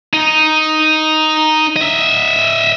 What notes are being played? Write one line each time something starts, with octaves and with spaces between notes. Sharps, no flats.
D#4
D#5 E5